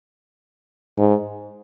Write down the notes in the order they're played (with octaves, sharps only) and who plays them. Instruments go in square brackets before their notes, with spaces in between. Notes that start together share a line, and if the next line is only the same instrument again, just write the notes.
[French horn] G#2